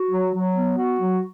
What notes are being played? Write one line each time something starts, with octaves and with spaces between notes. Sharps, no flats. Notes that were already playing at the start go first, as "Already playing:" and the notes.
Already playing: F#4
F#3
F#3
B3
F#4
F#3